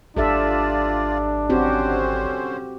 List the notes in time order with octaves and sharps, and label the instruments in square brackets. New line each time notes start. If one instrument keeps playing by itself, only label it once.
[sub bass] G#1 [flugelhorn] D4 [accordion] F4 D5 [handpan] G4 A4 E5
[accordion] D3 C#4 C5 [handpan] C4 F#4 G4